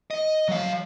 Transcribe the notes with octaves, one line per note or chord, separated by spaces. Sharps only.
D#5
F#3 F5